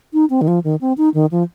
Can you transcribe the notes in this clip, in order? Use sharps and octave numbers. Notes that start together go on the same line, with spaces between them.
D#4
C4
D#3
F3
D#3
C4
D#4
D#3
F3